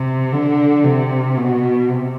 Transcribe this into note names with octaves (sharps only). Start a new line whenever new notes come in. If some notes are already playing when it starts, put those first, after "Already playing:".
Already playing: C3
D3
C3
B2
C3